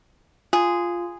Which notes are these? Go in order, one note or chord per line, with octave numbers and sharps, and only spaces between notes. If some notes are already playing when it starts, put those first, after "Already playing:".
F4 G#4